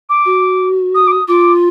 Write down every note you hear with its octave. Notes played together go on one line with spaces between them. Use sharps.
D6
F#4
D#6
D6
D#6
F4 D6